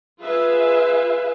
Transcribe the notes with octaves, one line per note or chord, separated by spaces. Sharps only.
F4 G#4 B4 E5 F5 G#5